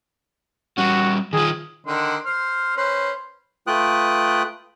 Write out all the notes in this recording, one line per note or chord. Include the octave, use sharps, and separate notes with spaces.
G3 C#4 F#4
D#3 F4 G#4
D3 D#3 C6
C5 F6
C#4 B4 C5
A3 F4 B4 G5 D#6 F#6